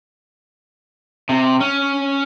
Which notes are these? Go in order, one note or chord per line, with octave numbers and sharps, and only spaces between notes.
C3
C#4